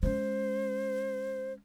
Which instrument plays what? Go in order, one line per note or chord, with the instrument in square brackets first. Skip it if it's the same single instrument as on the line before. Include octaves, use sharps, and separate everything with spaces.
[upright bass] G#3 C#4 [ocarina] C5